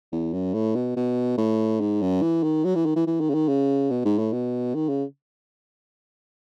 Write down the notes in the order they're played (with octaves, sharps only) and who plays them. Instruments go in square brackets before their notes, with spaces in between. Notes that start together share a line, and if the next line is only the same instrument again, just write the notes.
[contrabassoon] E2
F#2
A2
B2
B2
A2
G#2
F#2
E3
D#3
F#3
E3
D#3
E3
E3
D#3
C#3
D#3
C#3
B2
G#2
A2
B2
D#3
C#3